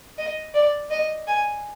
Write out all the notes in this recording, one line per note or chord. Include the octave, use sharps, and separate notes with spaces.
D#5
D5
D#5
G#5